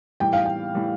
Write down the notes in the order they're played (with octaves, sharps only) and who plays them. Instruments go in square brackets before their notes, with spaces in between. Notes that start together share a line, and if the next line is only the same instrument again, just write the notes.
[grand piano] A2 E3 G3 [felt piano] G5
[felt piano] F5
G5
[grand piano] A2 E3 G3